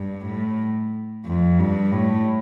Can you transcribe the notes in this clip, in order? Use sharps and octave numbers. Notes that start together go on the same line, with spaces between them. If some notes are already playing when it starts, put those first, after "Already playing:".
Already playing: G2
A2
F2
G2
A2